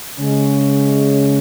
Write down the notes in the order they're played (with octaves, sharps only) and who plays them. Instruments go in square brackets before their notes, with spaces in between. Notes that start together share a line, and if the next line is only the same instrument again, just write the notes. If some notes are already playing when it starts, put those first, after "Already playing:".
[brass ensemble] C#3 G#3 C#4